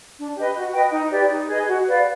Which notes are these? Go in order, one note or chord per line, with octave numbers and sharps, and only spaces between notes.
D4
G4 B4 D#5
F#4
B4 D#5 G5
D#4
G4 B4 D5
D#4
G#4 B4 D#5
F#4
B4 D5 F5